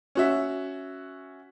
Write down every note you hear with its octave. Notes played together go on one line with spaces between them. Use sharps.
C#4 F#4 E5